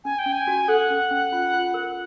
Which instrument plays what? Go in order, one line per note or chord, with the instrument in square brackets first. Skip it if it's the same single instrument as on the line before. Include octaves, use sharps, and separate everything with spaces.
[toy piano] C#4 [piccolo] G#5
[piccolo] G5
[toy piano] C#4
[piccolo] G#5
[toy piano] F#4
[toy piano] A4 [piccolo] F#5
[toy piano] C#4
C#4
F4
F4
A#4